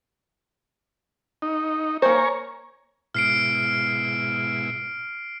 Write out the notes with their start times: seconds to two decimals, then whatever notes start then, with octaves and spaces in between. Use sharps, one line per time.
1.42 D#4
2.02 A#3 C5 C#5 G#5 A#5
3.14 G#2 B2 E4 F6 C7 D7